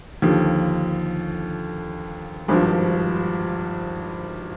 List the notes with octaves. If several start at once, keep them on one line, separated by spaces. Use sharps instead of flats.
D#2 D3 F3
G#1 G2 F3